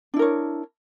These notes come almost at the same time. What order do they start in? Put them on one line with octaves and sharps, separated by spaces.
D4 E4 A#4 C#5